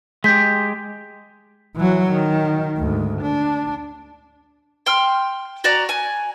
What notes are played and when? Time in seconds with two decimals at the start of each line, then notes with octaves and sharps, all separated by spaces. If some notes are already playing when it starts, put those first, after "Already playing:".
0.24 G#3 G4 G6 B6
1.76 E3 F#3
2.11 D#3
2.78 D2 G#2
3.22 D4
4.86 G5 C6 F6
5.64 F#4 D5 A#5
5.89 G#5